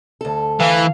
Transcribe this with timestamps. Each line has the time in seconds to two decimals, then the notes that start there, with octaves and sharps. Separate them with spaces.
0.21 D2 A4
0.60 E3 F5